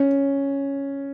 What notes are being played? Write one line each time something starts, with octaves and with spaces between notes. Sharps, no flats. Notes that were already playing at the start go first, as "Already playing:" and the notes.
Already playing: C#4